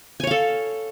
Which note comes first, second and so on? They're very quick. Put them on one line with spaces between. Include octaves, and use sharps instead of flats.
G#5 C#5 F5 A4